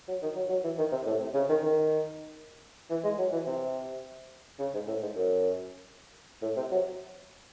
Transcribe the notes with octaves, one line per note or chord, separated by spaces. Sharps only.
F#3
D#3
F#3
F#3
E3
D#3
C3
A2
C3
C#3
D#3
D#3
E3
G#3
F#3
E3
C3
C#3
G#2
A2
G#2
F#2
A2
C3
F#3